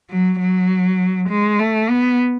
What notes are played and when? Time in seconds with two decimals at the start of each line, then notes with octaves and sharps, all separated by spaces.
0.10 F#3
0.39 F#3
1.29 G#3
1.59 A3
1.89 B3